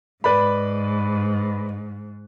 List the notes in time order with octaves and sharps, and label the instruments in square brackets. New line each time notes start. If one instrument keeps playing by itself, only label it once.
[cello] G#2 [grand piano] B4 D5 B5